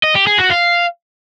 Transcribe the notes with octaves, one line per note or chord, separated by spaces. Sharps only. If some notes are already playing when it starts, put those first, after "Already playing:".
D#5
G4
G#4
F#4
F5